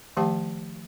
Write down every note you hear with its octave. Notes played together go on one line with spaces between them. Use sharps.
D#3 F3 A3 G4 F5 A5